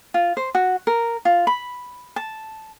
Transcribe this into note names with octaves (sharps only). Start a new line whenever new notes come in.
F4
C5
F#4
A#4
F4
B5
A5